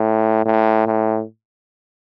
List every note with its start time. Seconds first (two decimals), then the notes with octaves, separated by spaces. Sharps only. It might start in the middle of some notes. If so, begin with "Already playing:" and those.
Already playing: A2
0.46 A2
0.87 A2